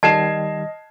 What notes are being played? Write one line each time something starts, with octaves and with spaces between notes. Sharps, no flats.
D#3 G3 D#5 A5 G#6 C7 E7